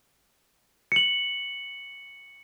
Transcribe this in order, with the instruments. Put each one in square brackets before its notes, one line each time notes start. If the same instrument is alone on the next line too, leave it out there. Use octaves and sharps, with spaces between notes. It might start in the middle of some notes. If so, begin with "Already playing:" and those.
[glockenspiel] C#7 F#7